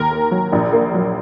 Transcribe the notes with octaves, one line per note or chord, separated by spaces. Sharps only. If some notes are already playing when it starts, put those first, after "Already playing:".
Already playing: D#2 A#4
A#3
F#3
A#1
A#3
F#3